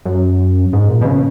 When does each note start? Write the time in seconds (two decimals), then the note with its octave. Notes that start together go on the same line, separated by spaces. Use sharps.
0.05 F#2
0.73 G#2
0.89 A#2
1.01 B2
1.05 C#3